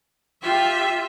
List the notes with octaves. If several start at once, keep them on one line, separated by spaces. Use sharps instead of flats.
F4 G4 E5